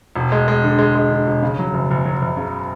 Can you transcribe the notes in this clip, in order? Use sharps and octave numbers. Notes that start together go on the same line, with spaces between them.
E1
G#3
G#3
D3
G#3
G#3
D3
E1
C#3
F#3
F#1
F#1
F#3
F#1
C#3